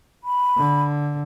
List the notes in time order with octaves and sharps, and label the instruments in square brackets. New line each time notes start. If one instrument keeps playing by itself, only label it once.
[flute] B5
[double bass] D3